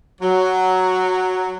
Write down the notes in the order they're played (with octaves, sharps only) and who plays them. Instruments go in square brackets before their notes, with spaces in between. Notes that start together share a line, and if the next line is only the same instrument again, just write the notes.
[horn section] F#3